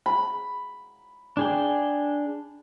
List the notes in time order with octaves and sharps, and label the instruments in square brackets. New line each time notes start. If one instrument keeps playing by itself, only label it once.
[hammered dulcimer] B5
[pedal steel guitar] D4 G#4 G5